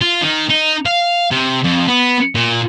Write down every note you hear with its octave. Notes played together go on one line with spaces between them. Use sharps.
F4
D#3
D#4
F5
C3
F2
B3
A#2